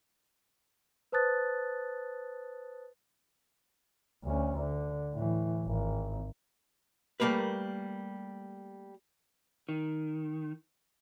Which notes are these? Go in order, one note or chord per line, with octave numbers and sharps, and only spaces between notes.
B4 C5 A5 D#6 F#6 A6
D2 C#4
D3
A2 E3
G#1
G3 A3 A#3 A#4 B4
D#3